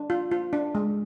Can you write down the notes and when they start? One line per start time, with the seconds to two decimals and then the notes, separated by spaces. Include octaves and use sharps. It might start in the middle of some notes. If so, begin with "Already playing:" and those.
Already playing: D4
0.10 F4
0.31 F4
0.53 D4
0.75 G#3